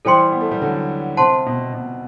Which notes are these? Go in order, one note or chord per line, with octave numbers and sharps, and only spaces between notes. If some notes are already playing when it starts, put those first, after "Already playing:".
E3 G3 A4 C5 G5 C6
B3
A3
G3
D3 F#3
C3 C5 F#5 A5 C6
B2
B2